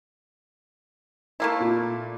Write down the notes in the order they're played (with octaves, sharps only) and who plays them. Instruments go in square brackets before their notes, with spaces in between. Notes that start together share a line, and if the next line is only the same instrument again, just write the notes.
[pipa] A3 A#3 E4
[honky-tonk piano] A#2